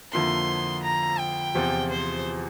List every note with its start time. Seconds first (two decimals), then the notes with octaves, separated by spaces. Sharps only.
0.12 F2 D3 F3 A#3 E4 C6
0.84 A#5
1.19 G5
1.54 E2 C3 F3 C4 F4
1.90 C5